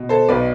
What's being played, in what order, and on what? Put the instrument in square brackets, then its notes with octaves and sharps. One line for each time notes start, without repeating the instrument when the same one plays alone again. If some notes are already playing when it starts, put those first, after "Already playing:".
Already playing: [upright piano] B2
A4 C5
B1 B2 B4 D5